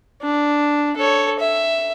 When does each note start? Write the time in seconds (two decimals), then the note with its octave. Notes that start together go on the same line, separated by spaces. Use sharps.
0.22 D4
0.97 A4 C#5
1.39 E5